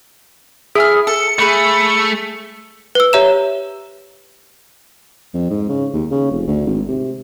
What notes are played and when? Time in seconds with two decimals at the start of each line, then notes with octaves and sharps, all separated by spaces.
0.75 E4 G#4 G#5 F6
1.07 A4 C#7
1.39 A3 G#4 B5 F#6
2.95 B4 E6
3.13 G4 C#5 E5 A#5 E7
5.34 F2
5.50 G#2
5.69 C#3
5.93 D#2
6.11 C#3
6.31 F1
6.47 D2
6.67 G#1
6.88 C3